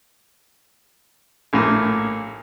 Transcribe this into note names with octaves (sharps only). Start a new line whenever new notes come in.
A#1 A2 A#3